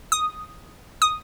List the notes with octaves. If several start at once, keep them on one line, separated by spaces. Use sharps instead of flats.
D#6
D#6